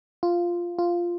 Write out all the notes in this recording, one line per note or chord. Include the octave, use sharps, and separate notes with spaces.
F4
F4